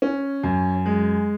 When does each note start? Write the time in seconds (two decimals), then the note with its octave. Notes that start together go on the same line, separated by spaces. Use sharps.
0.02 C#4
0.43 F#2
0.86 G#3